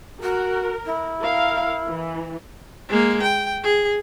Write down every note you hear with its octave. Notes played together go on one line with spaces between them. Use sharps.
F#4 A#4
E4
A#4 F5
E3
G#3 A#3
G5
G#4